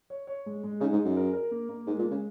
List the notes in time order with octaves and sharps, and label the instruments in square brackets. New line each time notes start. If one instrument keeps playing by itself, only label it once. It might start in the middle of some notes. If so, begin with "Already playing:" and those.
[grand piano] C#5
C#5
G#3
G#3
[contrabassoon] C#3 [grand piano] D#4
[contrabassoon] G#2
[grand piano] G#4
[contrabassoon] F#2
[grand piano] A#4
A#4
A#3
A#3
[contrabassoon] G#2 [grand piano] G#3
[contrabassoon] A#2
[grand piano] G#3
[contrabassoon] C#3